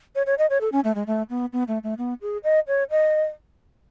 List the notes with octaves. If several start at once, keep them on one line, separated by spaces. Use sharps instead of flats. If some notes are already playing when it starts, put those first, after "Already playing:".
C#5
C#5
D#5
C#5
A4
C#4
A3
G#3
A3
B3
B3
A3
A3
B3
G#4
D#5
C#5
D#5